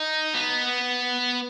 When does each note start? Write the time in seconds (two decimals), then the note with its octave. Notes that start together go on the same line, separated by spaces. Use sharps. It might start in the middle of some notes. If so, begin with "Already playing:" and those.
Already playing: D#4
0.34 B3